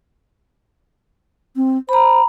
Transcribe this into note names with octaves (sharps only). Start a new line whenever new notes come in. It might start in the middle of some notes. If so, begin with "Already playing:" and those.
C4
C5 A#5 B5